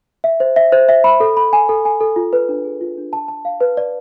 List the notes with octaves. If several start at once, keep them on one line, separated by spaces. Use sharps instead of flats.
E5
C5
E5
C5
E5
B5
A4
B5
G#5
A4
G#5
A4
F4
B4
D4
G#4
F4
D4
A5
A5
F5
B4
D5